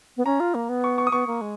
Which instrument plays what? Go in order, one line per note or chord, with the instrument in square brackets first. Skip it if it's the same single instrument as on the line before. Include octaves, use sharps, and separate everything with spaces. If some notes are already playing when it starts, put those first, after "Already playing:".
[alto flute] B3
[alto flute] C#4 [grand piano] A#5
[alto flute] F4
A#3
B3
[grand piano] C#6
C#6
D#6
[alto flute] B3 [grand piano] C#6
[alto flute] A#3
G#3